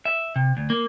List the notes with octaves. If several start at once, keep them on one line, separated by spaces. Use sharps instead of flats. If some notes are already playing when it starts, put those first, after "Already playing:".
E5
C3
D2
A#3